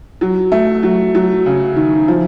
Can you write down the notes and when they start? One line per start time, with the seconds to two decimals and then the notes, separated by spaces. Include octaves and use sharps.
0.21 F#3
0.52 A3
0.83 F#3
1.15 F#3
1.46 C#3
1.76 D#3
2.08 F3